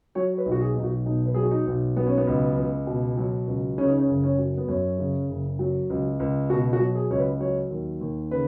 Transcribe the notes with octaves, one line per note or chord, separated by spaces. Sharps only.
F#3 C#5
C#5
B4
B1
F#4
G#4
B1 D#4
F#4
B2 D#4
B4
F#3 G#4
F#4
D#4
B1
F#3 B3
C#4
B3
C#2
C#2
B2
F#3
C#2
C#3 C#4
D#4
C#4
F#1
C#4
F#3
B3
F#2 C#4
C#3
F#1
F#3
C#2
C#2
B2 F#4
F#4
F#3
G#4
C#2 C#5
B4
F#3 C#5
D#2
D#2
C#3 B4